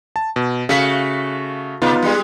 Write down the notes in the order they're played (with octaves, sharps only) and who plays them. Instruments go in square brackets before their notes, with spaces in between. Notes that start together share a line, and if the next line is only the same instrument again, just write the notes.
[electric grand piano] A5
B2
[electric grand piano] C#3 F5 B6 [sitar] A3 F#4
[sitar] C3 [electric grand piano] B3 D#4 F4
[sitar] G3 G#3